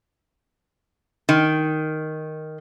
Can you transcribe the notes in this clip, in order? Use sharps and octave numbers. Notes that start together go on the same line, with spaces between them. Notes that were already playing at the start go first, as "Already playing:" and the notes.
D#3